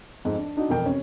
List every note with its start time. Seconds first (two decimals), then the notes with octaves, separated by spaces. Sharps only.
0.25 F2 G#2
0.38 D4
0.57 D4 D#4 F#4
0.69 E1 F2 A#4 G5
0.86 C3 C#4